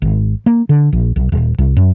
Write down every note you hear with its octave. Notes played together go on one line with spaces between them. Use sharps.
G#1
A#3
D3
A#1
B1
D#1
C2
F#2